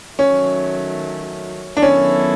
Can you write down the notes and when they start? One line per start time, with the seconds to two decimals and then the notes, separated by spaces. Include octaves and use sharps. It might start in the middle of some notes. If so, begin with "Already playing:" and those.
0.18 D#3 F#3 A3 C#4
1.77 D4
1.82 D#3 F#3 B3 C#4 E4 A4